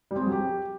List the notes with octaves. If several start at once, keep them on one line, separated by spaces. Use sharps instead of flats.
G3
C4
G#4
F#3
G4